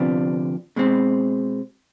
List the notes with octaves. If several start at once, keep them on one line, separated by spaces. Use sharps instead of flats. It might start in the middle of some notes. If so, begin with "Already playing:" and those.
Already playing: D2 C3 F3 B3 D4
B2 G#3 C4